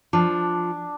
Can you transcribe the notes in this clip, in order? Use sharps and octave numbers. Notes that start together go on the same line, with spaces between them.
F3 D4